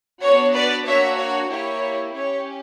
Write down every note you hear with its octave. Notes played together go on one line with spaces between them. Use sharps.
B3 D4 F#4 C#5
B4 D5
A#3 D4 F#4 C#5 E5
C#5
A#3 E4 G4 C#5
C#4 G4 C#5